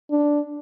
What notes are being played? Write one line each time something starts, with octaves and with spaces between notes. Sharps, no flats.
D4